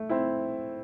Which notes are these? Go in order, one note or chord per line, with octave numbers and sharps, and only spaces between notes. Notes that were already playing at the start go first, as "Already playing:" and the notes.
Already playing: A3
C4 E4